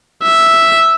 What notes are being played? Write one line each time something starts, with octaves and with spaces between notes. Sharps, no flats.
E5